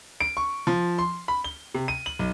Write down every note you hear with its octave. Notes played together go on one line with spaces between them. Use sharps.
D7
C#6
F3
C6
B5
G7
C3
D#7
F#7
B1